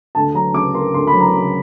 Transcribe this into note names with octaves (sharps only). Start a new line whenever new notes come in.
D2 A5
F#3 A#5
C#3 D6
A#3 C6
D2 C6
B5
F#3
A#5
C#3